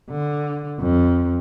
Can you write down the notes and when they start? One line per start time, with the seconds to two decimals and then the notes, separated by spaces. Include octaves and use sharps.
0.10 D3
0.79 F2